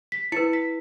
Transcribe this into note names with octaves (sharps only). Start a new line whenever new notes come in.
B6
E4 B4 C#7
B6